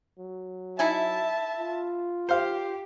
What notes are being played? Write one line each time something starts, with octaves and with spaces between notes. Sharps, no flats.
F#3
D#4 E4 E5 G#5 A5
F4
G4 C5 F5